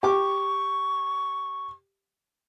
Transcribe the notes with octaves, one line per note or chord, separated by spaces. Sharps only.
G4 C#6 D6